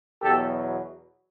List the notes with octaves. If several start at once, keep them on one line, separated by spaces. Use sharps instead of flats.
E2 B2 F#3 G4 A4